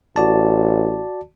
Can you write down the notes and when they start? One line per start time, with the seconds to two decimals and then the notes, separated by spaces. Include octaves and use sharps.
0.16 A1 F#4 D5 A5